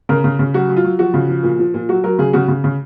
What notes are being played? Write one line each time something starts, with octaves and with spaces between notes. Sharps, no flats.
C#3 A#4
C#3
C#3
F#3 F#4
F#3
F4
F#3
F3 F#4
C#3
F3
A#2
F3
A#2
F#3 F#4
F#3 A#4
C#3 G#4
C#3 F#4
C#3
C#3